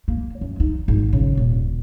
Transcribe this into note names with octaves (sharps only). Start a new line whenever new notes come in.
A#3
F#2
D#4
G#1
C#3
D#1